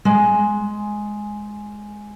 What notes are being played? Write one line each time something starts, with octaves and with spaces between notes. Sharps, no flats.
G#3 G#5